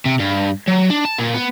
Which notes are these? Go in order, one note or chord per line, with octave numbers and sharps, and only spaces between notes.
C3
G2
F#3
D4
A5
A#2
B3